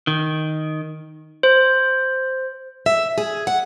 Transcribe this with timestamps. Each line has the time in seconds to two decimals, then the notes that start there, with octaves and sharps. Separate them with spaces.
0.07 D#3
1.43 C5
2.86 E5
3.18 G#4
3.47 F#5